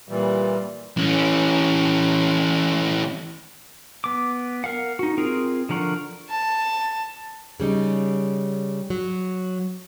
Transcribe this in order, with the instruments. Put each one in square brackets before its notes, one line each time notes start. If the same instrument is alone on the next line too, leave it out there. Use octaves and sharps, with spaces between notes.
[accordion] A#2 E3 G3
[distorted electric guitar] E3 C#4
[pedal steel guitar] B3 D6
A#4 F5 F#5
D#4 F#4
C4 F4 G#4 A#4
D3 F3 A#4 F#5 C#6
[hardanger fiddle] A5
[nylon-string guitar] C#3 G3 C#4 D#4
F#3